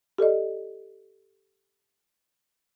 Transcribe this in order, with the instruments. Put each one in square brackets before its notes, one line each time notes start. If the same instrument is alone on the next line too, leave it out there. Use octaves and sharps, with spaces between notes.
[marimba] G4 A4 D5 D#5